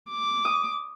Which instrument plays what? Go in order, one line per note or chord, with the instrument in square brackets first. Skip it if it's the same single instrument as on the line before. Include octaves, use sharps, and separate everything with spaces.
[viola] D6
[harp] D#6